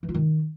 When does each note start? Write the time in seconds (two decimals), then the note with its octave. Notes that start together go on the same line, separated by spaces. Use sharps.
0.03 E3
0.09 F4
0.14 D#3